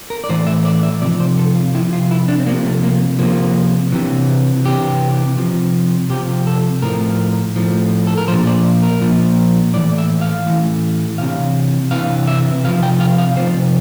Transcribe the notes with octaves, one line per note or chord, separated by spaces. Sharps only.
A#4
D5
A2 E3 C5
E5
D5
E5
C3 F3 D5
C5
A4
F4
C3 F3 E4
F4
E4
D4
C4
C3 F3 A#3
A3
A#3
C3 F3 A#3
C3 E3
C3 E3 G4
C3 F3
C3 F3 G4
A4
A2 F3 A#4
A2 F3
A4
A#4
A#2 F3 C5
D5
A#4
A#2 F3
A2 E3 D5
E5
F5
A2 E3
C3 E3 F5
C3 E3 F5
E5
C3 F3 F5
G5
F5
F5
C3 F3 C5